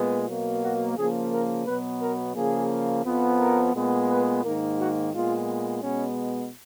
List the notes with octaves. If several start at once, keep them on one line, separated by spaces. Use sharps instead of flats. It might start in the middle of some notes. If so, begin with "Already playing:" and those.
Already playing: A#2 G#3 B3
B2 F#3 A#3
F#4
C#3 F3 A#3 G#4
A#4
B2 F#3 B3 B4
A#4
C#3 F3 A#3 G#4
F2 F3 B3
A#4
A#2 G#3 B3
B4
G#2 D#3 A#3 A#4
F#4
A#2 G#3 B3 F4
B2 G#3 B3 C#4